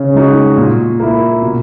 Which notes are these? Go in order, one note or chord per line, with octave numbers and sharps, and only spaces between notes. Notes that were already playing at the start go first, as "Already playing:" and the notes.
Already playing: C#3
G#3 D#4 F#4
A#2
A#3 E4
B2